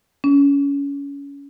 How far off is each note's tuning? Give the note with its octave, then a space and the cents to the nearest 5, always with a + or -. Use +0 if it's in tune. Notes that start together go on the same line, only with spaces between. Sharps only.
C#4 +25